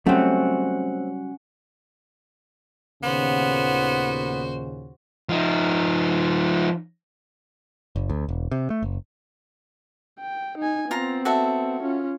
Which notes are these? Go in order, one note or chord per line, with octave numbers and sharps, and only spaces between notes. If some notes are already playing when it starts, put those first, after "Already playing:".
F#3 G3 A3 C4 C#4 F#5
D#2 A#2 C#3 B3 F#4 C5
F3 D#4
F#1
D2
E1
C3
A3
F#1
G5
D#4 G#5
B3 C4 F4 A#5
F#4 A4 E5
C#4 F4